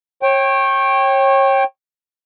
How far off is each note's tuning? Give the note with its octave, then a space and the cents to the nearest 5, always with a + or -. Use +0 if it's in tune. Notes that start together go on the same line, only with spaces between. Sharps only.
C#5 -30 G5 +0